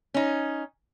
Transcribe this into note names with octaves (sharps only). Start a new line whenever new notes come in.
C#4 D#4